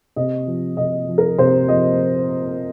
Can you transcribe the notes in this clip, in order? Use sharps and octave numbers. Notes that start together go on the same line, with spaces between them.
C3 D#5
F3
C3 D#5
F3
A#4
C3 C5
F3 D#5